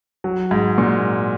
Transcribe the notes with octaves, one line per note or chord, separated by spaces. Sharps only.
F#3
G#2
A#2